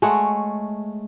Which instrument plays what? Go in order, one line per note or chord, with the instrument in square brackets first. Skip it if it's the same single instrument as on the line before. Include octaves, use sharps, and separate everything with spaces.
[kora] G#3 A3 C#5 F#5